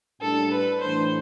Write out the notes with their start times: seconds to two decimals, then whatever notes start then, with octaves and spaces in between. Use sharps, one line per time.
0.21 A2 G3 D4 A4
0.51 B4
0.81 A2 E3 A3 D4 C5